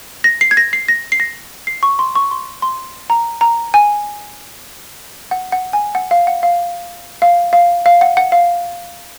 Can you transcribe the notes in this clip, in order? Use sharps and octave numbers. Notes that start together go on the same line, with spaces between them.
A#6
C7
G#6
A#6
C7
A#6
C7
A#6
C7
C#6
C6
C#6
C6
C6
A#5
A#5
G#5
F#5
F#5
G#5
F#5
F5
F#5
F5
F5
F5
F5
F#5
F#5
F5